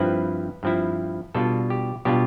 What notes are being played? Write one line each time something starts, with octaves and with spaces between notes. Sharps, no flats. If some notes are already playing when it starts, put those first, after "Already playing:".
Already playing: G2 F3 C4 E4 B4
G2 F3 C4 E4
B2 G3 D4 F4 A4
G4
B2 G3 D4 F4 G4